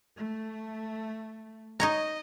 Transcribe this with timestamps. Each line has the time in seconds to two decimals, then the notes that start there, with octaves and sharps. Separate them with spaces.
0.16 A3
1.80 D#4 C#5 D#5 A#5